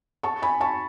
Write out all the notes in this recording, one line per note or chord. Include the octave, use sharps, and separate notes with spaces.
A5 C#6
G#5 B5
A5 C#6